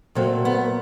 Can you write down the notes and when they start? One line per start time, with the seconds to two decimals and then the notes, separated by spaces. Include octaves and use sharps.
0.15 A#2 F#3 A3 C4
0.45 B3